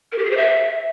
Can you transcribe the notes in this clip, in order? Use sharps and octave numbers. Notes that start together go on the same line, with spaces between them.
A#4
G4
G#4
C5
E5